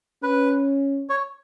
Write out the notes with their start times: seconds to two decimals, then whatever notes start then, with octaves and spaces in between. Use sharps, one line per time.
0.23 C#4 B4
1.10 C#5